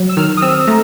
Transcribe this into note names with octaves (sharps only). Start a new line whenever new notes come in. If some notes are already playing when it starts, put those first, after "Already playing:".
Already playing: F#3
E6
D#3 F6
D#6
C4 E6
A3 A#5